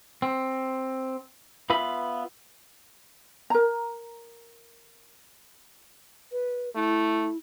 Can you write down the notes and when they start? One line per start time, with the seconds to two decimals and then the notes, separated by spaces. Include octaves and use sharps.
0.22 C4
1.70 B3 F4 B4 E5 B5
3.50 A#4 A#5
6.32 B4
6.75 A3 E4